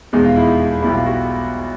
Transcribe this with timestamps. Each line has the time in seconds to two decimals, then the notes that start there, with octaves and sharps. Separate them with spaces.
0.13 F1 E2 B2 G#3 D#4
0.25 F4
0.36 E4
0.48 D#4
0.65 D#4
0.82 B1 B2 G3 E4
0.94 F4
1.06 F#4